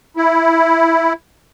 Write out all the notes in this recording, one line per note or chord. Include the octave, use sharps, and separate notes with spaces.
E4